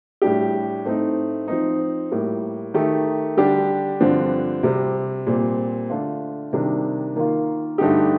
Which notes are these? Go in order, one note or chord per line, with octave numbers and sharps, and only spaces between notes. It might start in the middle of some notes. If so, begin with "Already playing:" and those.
A2 G3 D4 G4
A2 A3 C4 D#4
F3 C4 D#4
A2 G3 A#3
D#3 A3 D#4 G4
D3 G3 D4 G4
G2 D3 F3 C4
C3 G3 C4
A#2 G3 C4
D3 A3 D4 F4
C3 D#3 G3 D4
D#3 A#3 F4
G2 D3 A3 D#4 G4